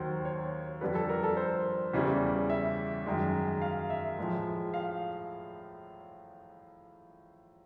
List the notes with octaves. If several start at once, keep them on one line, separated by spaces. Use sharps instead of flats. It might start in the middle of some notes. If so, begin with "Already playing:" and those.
Already playing: D#2 D#3 F#3 C5
C#5
F2 D3 G3 B4
A4
A#4
A4
C5
E2 C#3 E3 G3
E5
F#2 D#3 G#3
F5
E5
A2 F3 G#3
F5